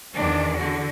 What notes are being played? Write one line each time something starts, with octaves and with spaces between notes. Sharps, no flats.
E2 D#3 E3 C#4 D4
D3 F#4